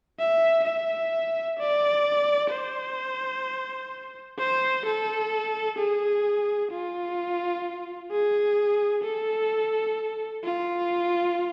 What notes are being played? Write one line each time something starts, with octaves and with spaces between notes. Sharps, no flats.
E5
E5
D5
C5
C5
A4
G#4
F4
G#4
A4
F4